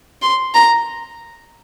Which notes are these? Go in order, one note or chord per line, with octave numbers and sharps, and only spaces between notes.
C6
A#5